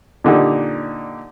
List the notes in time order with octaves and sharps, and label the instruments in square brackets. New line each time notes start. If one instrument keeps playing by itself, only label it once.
[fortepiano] A#2 D3 D#4 G4